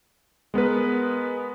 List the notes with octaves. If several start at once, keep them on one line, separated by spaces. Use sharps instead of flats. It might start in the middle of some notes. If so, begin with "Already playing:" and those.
G#3 B3 A#4 B4